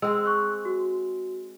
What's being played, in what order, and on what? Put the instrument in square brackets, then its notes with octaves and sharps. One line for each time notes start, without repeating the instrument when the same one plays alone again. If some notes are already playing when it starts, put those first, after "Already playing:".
[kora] G#3 C4 [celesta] E6
[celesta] C#6 F#6
F#4